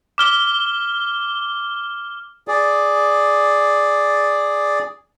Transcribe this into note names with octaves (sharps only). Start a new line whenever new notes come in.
D6 F6 G7
G#4 D5